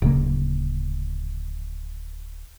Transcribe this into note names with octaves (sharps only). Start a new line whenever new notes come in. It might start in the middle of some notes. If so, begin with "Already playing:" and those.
D1 C#3 A#3